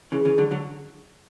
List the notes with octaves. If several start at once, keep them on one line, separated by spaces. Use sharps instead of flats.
C#3 E3 G#4
C#3 E3
D3 F#3
D3 F#3